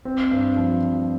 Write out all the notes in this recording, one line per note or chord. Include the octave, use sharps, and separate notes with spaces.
C4
G2
F3